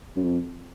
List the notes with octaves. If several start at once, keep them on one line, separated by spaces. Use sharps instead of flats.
F#2
F2